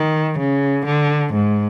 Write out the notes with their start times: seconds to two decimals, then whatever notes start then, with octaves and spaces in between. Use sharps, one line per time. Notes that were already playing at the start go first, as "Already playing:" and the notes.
Already playing: D#3
0.38 C#3
0.85 D3
1.33 G#2